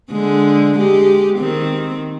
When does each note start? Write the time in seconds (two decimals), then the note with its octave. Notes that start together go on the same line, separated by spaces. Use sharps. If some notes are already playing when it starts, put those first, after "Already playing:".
0.12 D3 G#3
0.78 G#3 G4
1.39 D#3 C4